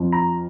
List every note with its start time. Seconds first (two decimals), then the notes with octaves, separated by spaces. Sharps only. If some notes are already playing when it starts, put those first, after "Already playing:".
Already playing: F2 F3
0.12 A#5